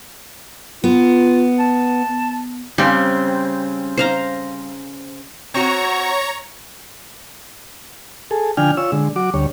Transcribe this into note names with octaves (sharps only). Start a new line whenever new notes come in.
B3 F4
A5
C#3 G3 C4
C5 F5 A#5
C4 F#4 C#5 A#5 C#6
G#4 A4
D3 F3 D4 G5 G#5 F6
F4 C#5 E6
D3 G#3
F#3 F#4 D6
D2 G3 C#5